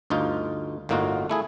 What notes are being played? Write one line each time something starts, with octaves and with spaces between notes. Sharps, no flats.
D2 G2 D#4 F4
G1 A2 A#3 D#4 F4 F#4
A3 E4 G#4